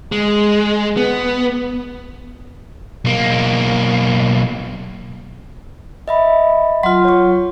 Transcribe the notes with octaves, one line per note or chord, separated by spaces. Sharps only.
G#3
B3
B1 A#3
D#5 E5 B5
F#3 F4 C6
C#5 C#6